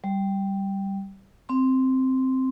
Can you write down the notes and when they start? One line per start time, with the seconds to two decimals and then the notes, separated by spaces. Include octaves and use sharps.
0.04 G3
1.49 C4 C6